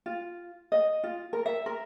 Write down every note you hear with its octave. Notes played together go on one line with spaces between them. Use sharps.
F4
D#5
F4
A#4
E5
A#4